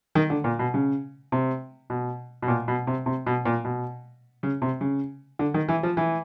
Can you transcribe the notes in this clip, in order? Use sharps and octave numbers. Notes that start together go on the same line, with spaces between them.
D#3
D3
A#2
B2
C#3
C3
B2
B2
A#2
B2
C3
C3
B2
A#2
B2
C#3
C3
C#3
D3
D#3
E3
F3
E3